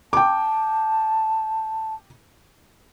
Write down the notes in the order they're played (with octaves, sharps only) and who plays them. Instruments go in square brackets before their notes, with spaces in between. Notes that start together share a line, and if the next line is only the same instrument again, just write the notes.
[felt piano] G5 D6 [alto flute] A5